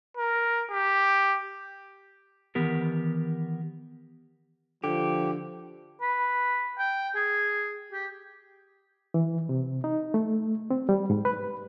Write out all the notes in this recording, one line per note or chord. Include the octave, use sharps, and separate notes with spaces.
A#4
G4
D#3 E3 B3 G4 A#4
D3 F3 G4
B4
G5
G#4
G4
E3
C3
D#4
A3
C4
G3
G#2
B4